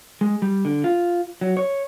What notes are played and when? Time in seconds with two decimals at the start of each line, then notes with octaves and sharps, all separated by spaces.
0.21 G#3
0.42 G3
0.65 D3
0.84 F4
1.41 F#3
1.57 C#5